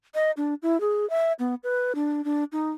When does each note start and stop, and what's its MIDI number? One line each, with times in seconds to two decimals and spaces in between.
0.15 0.31 75
0.37 0.54 62
0.62 0.80 64
0.81 1.08 68
1.10 1.32 76
1.39 1.55 59
1.64 1.93 71
1.95 2.24 62
2.25 2.44 62
2.52 2.71 63